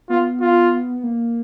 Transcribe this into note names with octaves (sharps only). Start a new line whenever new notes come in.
B3 F4
F4
A#3